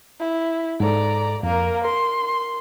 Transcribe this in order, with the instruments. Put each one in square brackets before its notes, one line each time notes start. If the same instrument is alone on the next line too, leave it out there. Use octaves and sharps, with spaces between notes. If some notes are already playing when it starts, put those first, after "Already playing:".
[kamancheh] E4
[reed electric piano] G#2 G#3 A4 [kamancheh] D5 A#5
[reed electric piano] F2 [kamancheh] A#3 A#4
[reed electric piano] A#4 [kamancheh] C6